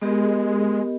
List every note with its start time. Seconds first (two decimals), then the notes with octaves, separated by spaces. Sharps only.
0.02 G#3 B3 G4 A#4 D#5